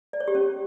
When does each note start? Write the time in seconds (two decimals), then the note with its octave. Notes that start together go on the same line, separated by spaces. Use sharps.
0.13 D5
0.20 C#5
0.28 G4
0.35 C#4